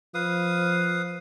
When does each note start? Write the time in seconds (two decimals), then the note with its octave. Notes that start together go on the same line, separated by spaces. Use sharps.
0.14 F3 B4 F5 D#6